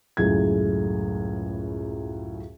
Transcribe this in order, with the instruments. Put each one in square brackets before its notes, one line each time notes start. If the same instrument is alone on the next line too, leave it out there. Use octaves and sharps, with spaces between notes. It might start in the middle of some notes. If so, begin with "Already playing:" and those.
[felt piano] C#2 F#2 A2 G#4 G#6